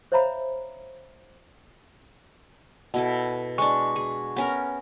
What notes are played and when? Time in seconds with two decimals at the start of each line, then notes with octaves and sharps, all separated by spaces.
0.12 C5 C#5 E5 F5 A#5 B5
2.94 B2 E4 A4
3.58 G#3 D4 C#6
3.96 G#4
4.36 B3 C#4 A#4